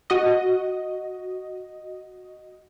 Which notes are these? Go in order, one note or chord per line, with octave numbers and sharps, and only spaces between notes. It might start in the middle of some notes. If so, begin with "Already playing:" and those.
F#4 D#5